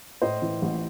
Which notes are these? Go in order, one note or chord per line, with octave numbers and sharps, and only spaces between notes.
A2 C5 D#5
E3
A1